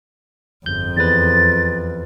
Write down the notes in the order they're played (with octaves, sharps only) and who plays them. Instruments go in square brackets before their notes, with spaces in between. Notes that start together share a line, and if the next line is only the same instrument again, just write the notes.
[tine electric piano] G1 G6 [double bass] F2
[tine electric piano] E2 B4 [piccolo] A6